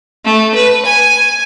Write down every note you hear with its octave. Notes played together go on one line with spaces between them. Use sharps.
A3
B4
G#5